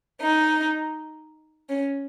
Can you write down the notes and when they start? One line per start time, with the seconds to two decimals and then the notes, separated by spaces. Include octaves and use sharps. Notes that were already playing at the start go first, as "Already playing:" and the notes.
0.21 D#4
1.69 C#4